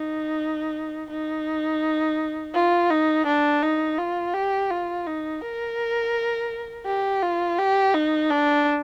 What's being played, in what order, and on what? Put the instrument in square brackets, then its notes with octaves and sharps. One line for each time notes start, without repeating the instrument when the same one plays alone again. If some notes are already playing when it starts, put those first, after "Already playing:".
Already playing: [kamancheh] D#4
D#4
F4
D#4
D4
D#4
F4
G4
F4
D#4
A#4
G4
F4
G4
D#4
D4